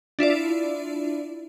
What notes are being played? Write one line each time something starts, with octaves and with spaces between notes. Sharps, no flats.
D4 E4 F4 D5